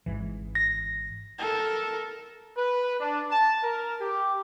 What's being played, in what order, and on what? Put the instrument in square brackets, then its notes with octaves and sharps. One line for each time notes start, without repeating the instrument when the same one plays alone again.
[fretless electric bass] G#1 G#2 E3
[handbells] A#6
[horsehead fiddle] A4 A#4
[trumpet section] B4
D4
A5
A#4
G4